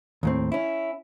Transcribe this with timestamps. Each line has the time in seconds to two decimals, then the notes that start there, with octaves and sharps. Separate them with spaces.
0.23 D#2 A2 C4
0.52 C#4 E4